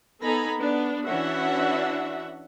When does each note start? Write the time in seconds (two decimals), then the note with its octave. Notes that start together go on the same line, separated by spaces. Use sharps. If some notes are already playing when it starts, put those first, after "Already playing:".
0.21 B3 D#4 A4 G#5 A#5 B5
0.59 B3 D4 B4
1.05 E3 C#4 D4 F#4 E5 F#5